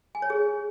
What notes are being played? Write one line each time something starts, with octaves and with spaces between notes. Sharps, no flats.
G#5
C#5
G#4